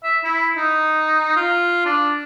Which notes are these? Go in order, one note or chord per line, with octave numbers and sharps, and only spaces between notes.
E5
E4
D#4
F4
D4